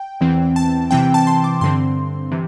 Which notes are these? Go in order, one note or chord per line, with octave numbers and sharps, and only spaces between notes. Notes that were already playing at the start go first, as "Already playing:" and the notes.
Already playing: G5
E2 E3 C4
A5
C3 E3 C4 G5
A5
C6
D6
G2 D3 C4 C6
C3 E3